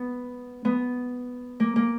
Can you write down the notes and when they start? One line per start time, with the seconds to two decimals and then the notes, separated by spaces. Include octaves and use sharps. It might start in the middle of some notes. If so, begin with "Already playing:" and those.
Already playing: B3
0.65 B3
1.60 A#3
1.76 A#3